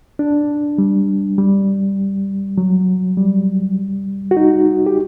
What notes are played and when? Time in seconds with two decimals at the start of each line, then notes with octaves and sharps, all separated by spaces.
0.19 D4
0.78 G3
1.38 G3
2.58 F#3
3.17 G3
4.31 F#4
4.37 D#4
4.86 G4